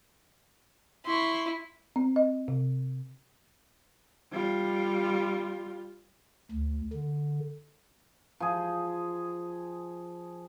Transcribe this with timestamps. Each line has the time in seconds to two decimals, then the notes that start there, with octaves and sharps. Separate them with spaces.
1.06 E4 C6 C#6
1.96 C4
2.16 D#5
2.48 C3
4.32 G3 F4
6.51 D2
6.93 D3
8.40 F3 G#4